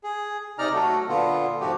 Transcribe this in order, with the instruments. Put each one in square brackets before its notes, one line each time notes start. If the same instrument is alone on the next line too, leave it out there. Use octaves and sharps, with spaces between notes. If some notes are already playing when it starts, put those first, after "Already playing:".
[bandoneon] G#4
C3 D#4 D5 A#5 F6
F#3 A3 F#4 A4
A#2 D3 B3 F4
G#2 C3 F3 F#4 G4